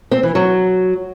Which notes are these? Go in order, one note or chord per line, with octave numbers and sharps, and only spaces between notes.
C4
E3
F#3